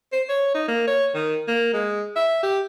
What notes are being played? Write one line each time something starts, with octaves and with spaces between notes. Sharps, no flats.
C5
C#5
D#4
A#3
C#5
D#3
A#3
G#3
E5
G4